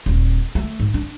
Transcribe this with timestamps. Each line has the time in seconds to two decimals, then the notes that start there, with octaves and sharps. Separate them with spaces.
0.06 D#1
0.55 A3
0.80 G#2
0.94 D4